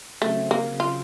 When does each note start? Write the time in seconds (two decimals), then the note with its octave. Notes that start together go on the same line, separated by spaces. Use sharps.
0.21 C#3 F#3 A3 C4
0.51 A#3
0.80 F4